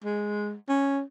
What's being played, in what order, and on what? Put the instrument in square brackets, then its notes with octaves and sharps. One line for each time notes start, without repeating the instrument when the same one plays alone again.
[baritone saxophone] G#3
C#4